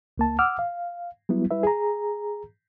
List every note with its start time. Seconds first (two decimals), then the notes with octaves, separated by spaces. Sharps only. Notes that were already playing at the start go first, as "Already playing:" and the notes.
0.18 C#2 A#3 A5
0.39 F#5 D6 E6 F6
0.59 F5
1.29 F#3 G3 B3 E4
1.51 G3 E4 B4 E5
1.63 G#4 A#5